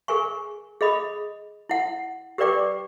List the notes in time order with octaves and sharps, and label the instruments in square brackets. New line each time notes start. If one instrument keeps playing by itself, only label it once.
[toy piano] G#4 A#4 G#5 C#6
G#4 D#5 B5 D#6
E4 F#5
G4 A#4 B4 D5 G5 D6